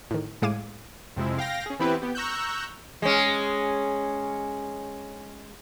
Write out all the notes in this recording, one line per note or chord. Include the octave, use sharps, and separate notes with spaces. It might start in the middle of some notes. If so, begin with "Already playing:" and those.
A2 D#3
A2 G#3 F5 D6 G#6 D#7
F2 C3 F3 G#3 E4
F5 G5 A#6
C#4 G#4
E3 B3 C4 E4 G4 B4
B3 G4
A#5 C#6 E6 F#6 G6
G#3 C#4